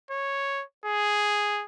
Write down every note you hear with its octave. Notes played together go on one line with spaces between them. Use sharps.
C#5
G#4